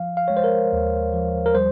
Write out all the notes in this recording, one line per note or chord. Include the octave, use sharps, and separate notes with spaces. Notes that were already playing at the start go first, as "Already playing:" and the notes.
Already playing: F3 F5
F5
G#3 C#5
C5
A#4
D#2
F3
A#4
G3 C5